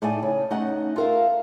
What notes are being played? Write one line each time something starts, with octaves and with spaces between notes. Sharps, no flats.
A2 A3 D#4 E4 D5 G#5
C#3
A3 C#4 D#4 D#5 F#5
F4 A4 A#4 E5 F5